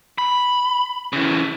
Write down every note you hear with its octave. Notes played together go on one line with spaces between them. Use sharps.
B5
C#3 E3